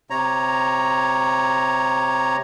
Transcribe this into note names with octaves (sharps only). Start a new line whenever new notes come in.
C3 C#5 A#5